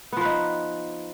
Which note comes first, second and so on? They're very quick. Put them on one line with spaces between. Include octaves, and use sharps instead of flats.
B3 F3 B4 D#4